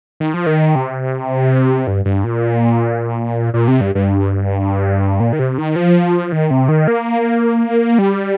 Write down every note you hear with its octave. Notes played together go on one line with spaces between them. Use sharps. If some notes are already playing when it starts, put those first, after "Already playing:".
D#3
F3
D#3
C3
G2
G2
A#2
A#2
C3
G2
G2
A#2
D#3
C3
D#3
F3
D#3
C3
D#3
A#3
G3